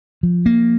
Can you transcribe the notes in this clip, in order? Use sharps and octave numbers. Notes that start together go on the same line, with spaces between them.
F3
A#3